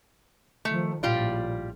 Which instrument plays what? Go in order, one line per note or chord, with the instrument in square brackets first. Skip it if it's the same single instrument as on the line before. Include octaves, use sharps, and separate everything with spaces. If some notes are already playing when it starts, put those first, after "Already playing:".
[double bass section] D#3 F3 [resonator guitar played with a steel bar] A3
[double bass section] A#1 A2 [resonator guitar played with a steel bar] G3 F4 D5